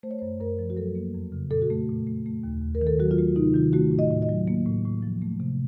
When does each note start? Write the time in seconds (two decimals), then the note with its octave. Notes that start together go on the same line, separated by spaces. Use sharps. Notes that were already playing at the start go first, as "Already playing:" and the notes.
0.03 A3 C5
0.11 C#5
0.19 F#2 C5
0.41 F#2 A#4
0.59 F3
0.70 F#4
0.77 F#3 A4
0.95 A#3
1.15 F2
1.32 C#3
1.51 A#2 A4
1.62 F#4
1.70 A3 A4
1.89 A#2
2.07 A3
2.26 A3
2.44 D#2
2.62 D#2
2.75 A#4
2.81 D#3
2.87 A4
2.99 F#3 F#4
3.11 F4
3.18 A3 F#4
3.36 C3 D#4
3.54 D#3 F4
3.73 A3 F#4
3.92 A2
3.99 D#5
4.11 A2
4.22 D#5
4.29 F#3
4.48 A#3
4.66 A2
4.85 A2
5.02 F3
5.22 A3
5.40 C3